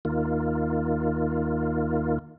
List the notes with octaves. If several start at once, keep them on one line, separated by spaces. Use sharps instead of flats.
D#2 D#3 A#3 F4